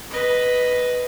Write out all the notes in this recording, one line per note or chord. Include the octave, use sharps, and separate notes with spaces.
B4 D#5